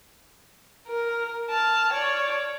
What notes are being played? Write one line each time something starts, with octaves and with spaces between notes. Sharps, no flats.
A#4
A5 F6
C#5 D5